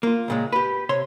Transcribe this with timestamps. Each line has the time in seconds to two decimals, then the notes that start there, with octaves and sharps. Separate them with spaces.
0.03 A#3 F4
0.28 C#2 A#2 G#3
0.52 G4 B4
0.89 C3 C#5 C6